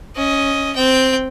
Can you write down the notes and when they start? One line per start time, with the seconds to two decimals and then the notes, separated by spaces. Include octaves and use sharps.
0.16 C#4 D#5
0.75 C4 G5